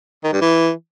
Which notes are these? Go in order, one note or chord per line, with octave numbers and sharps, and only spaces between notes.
D#3
G2
E3